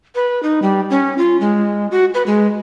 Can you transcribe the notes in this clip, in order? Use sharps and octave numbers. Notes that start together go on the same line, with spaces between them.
B4
D#4
G3
C#4
F4
G#3
F#4
B4
G#3